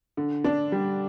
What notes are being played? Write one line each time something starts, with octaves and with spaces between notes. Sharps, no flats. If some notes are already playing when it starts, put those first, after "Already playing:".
D3
D4
G3